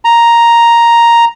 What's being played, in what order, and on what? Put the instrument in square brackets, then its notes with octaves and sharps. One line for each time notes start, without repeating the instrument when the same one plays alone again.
[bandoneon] A#5